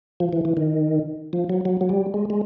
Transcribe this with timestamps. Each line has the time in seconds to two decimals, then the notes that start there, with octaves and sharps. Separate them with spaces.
0.20 F3
0.33 E3
0.45 E3
0.57 D#3
1.33 F3
1.50 F#3
1.65 F#3
1.81 F#3
1.89 G3
2.14 G#3
2.30 G#3